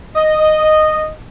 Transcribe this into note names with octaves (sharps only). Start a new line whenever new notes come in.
D#5